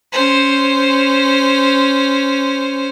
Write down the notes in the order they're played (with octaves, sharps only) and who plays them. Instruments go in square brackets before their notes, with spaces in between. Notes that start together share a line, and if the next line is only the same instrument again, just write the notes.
[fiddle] C#4 C5